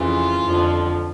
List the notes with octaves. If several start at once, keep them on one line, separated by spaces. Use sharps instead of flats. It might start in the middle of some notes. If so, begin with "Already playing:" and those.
Already playing: F2 C#3 E3 F4
F2 D3 F3